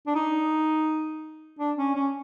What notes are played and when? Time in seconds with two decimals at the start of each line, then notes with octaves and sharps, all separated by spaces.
0.07 D4
0.15 D#4
1.59 D4
1.78 C#4
1.95 C#4